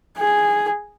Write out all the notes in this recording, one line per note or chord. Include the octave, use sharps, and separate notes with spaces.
G#4